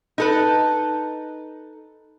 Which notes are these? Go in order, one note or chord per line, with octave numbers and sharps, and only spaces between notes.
D#4 A4 B4